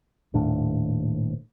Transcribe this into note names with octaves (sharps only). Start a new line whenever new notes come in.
D#1 D#2 A2 D4